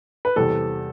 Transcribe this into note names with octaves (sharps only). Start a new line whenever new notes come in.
B4
E2 C3 G3 A4